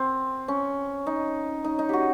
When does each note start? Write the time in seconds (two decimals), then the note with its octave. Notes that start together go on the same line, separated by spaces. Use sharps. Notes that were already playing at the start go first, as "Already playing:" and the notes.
Already playing: C4
0.48 C#4
1.06 D#4
1.64 D#4
1.79 D#4
1.89 F#4 G4